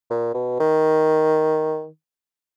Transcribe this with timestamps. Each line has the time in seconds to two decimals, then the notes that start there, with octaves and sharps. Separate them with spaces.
0.10 A#2
0.34 B2
0.60 D#3